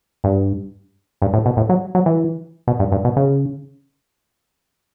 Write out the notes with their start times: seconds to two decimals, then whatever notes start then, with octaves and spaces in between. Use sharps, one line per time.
0.24 G2
1.22 G2
1.33 A2
1.46 B2
1.57 A2
1.69 F#3
1.95 F#3
2.06 E3
2.67 B2
2.79 G2
2.92 G2
3.05 B2
3.16 C#3